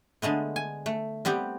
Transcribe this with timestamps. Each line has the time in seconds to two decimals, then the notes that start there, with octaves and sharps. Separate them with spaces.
0.22 D3 G#3 A3 B3
0.56 G#5
0.86 A3
1.25 G3 B3 C4 G4